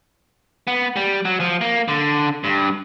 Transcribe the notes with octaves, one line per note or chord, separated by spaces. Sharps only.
B3
G3
F#3
F3
A#3
D3
G2